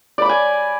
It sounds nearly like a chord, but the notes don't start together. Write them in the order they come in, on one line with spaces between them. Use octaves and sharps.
D5 B5 D6 G#5